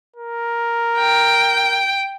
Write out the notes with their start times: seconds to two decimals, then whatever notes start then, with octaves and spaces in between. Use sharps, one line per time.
0.16 A#4
0.97 G5